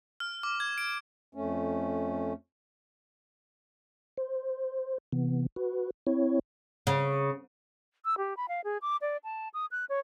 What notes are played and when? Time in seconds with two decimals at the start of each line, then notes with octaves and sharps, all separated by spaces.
0.20 F6
0.43 D6
0.60 G#6
0.78 D7
1.35 F2 A3 C#4
4.17 C5
5.12 C3 E3 B3
5.56 F#4 B4
6.07 C4 E4 C#5
6.87 C#3
8.05 E6
8.18 G4
8.37 B5
8.48 F5
8.64 G#4
8.82 D6
9.01 D5
9.24 A5
9.54 D#6
9.71 F#6
9.89 C#5